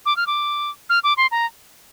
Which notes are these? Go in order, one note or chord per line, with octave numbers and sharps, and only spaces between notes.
D6
F6
D6
F6
D6
C6
A#5